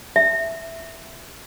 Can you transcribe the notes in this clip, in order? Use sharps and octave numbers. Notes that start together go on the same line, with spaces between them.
E5